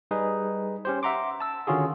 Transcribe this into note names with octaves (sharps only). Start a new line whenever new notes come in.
G3 D#4 G#4 B4
C#4 G4 C5
E5 F#5 A#5 C6 D6
A5 E6
D3 D#3 C#4 F4 F#4 G#4